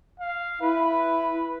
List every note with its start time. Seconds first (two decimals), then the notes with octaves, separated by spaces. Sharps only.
0.20 F5
0.61 E4 B4